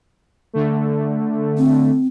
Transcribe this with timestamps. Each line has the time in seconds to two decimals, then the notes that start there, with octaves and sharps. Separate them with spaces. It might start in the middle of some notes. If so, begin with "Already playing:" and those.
0.53 D3 A3
1.58 C4